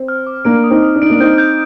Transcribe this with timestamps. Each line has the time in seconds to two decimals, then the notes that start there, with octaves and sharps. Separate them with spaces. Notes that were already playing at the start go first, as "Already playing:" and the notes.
Already playing: C4
0.08 F6
0.27 D6
0.45 A#3 D4 D7
0.64 D#6
0.70 C4 D#4
0.83 D#6
0.96 D4
1.02 D#4 D7
1.10 A#3 D4
1.20 C4 D#4 G6
1.38 G6